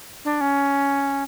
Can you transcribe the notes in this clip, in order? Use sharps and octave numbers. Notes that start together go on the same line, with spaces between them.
D4
C#4